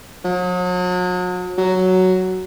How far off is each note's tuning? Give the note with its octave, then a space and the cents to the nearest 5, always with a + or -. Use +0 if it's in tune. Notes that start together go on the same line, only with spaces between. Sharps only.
F#3 -40
F#3 +5